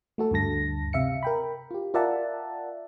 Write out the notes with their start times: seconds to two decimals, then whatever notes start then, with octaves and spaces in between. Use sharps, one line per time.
0.18 A3 F#4 A4
0.31 D2 G2 D3 A5 A#6
0.93 C3 E5 F5 C#7
1.23 A#4 G5 B5
1.71 F4 G4
1.94 F4 A#4 D5 E5 F#5 A5